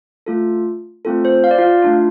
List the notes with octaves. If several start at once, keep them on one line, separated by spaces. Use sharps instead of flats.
A3 F4 A4
A3 C4 F4 A4
C5
F5
D5
F4 F5
A3 D4 F4